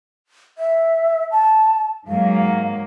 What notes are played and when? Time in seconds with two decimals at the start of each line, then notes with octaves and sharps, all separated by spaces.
0.58 E5
1.32 A5
2.08 G#2 F#3 A#3 F5